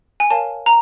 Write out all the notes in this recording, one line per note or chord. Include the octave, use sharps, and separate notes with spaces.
G#5
A#4 C#5 F5 A5
A#5